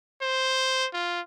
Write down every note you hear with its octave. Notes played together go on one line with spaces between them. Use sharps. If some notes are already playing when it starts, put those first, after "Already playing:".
C5
F4